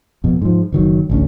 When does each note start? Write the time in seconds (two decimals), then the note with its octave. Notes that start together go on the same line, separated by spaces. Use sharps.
0.24 F2 B2
0.42 G#2 F3
0.72 F#1 D#3 F#3
1.10 A1 D2 C#4